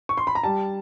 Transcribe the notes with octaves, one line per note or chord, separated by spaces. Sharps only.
C#6
C6
B5
A#5
G3 A5